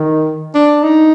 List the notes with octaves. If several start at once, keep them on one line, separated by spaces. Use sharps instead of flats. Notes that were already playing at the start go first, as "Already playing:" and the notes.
Already playing: D#3
D4
D#4